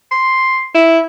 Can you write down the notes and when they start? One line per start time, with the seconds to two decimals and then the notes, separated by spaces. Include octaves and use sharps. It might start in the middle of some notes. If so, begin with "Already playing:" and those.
0.12 C6
0.74 E4